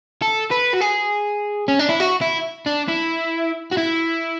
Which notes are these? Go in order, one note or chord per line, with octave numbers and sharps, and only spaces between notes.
A4
B4
F#4
G#4
C#4
D4
E4
F#4
E4
D4
E4
F#4
E4